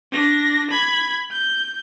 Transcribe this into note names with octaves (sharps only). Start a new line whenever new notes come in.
D4 A#6
B5 G#6
G6